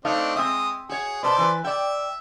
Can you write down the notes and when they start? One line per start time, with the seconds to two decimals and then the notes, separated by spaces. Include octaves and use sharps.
0.05 A3 C4 D4 D#4 A4 F5
0.36 G#3 C4 E5 D#6
0.89 F#4 G#4 C#5
1.23 B2 B4 C5 D5 A5 C6
1.38 E3 B4
1.64 D5 E5 G5